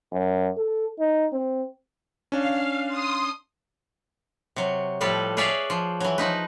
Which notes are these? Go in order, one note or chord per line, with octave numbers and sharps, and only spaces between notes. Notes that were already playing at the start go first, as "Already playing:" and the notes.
F#2
A4
D#4
C4
C#4 D4 F5
C6 D#6
C3 F#3
A2 F3 G3 A4 B4
G#4 B4 C#5 D5 E5 F5
F3
E3 F#3
F3 D#4 B4